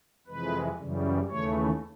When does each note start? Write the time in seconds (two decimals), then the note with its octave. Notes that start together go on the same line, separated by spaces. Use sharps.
0.27 F2 C3 E3 G#3 B4
0.78 F#2 C#3 E3 G3
1.29 D#2 C#3 E3 A3 C#5